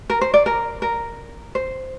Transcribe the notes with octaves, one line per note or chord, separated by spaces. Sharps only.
A#4
C5
D5
A#4
A#4
C5